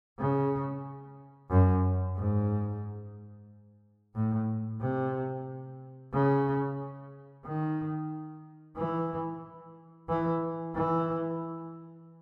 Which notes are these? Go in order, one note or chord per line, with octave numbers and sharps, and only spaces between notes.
C#3
F#2
G#2
A2
C3
C#3
D#3
E3
E3
E3